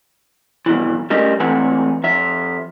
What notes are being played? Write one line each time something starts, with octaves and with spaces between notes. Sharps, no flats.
G2 B2 D#3 E3
G3 A3 C#4 A#4 D#5
E3 A3 C4 B4 F#5 G#5
F2 E5